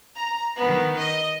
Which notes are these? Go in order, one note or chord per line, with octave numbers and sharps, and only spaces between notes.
A#5
D#3 B3
D#5